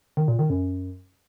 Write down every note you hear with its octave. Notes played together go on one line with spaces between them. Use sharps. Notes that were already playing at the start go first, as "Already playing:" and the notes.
D#3
A#2
D#3
F#2